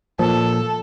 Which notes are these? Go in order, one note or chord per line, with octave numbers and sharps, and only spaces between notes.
A#2 F3 A4